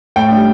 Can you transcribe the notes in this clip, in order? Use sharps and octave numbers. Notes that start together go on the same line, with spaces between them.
A2 G5
D4
G3